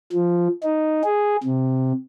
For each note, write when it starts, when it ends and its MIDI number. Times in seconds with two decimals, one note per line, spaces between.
0.13 0.48 53
0.64 1.02 63
1.04 1.36 68
1.43 1.92 48